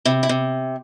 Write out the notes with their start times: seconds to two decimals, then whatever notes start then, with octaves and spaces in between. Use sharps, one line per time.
0.05 C3 E4
0.23 E4
0.29 C3